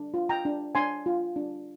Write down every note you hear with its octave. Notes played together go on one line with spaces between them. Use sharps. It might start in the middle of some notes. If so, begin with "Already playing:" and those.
Already playing: D4
F4
G5 A#5
D4
D4 G#5 C6
F4
D4